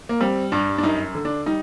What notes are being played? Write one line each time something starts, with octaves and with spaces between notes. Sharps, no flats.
A#3
G3 C4
G2 D4
D4
F#2 D#4
D3
D4
G3 D#4